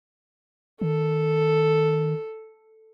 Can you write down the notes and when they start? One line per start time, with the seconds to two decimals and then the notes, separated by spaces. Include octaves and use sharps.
0.81 D#3 A4